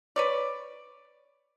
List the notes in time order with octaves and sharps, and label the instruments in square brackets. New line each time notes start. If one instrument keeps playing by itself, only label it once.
[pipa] B4 C#5 D5